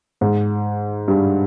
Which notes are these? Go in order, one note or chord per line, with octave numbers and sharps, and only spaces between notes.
G#2
G2